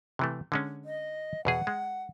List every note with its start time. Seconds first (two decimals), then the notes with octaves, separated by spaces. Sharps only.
0.19 C3 E3 A3
0.52 D3 G#3 C#4
0.85 D#5
1.45 E2 B2 G#4 F#5
1.67 G#3